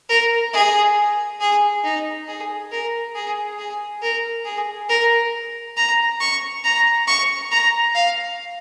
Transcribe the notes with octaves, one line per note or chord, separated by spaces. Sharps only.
A#4
G#4
G#4
D#4
G#4
A#4
G#4
G#4
A#4
G#4
A#4
A#5
C#6
A#5
C#6
A#5
F5